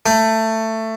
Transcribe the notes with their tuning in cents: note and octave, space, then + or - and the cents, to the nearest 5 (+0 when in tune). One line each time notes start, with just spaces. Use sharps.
A3 +15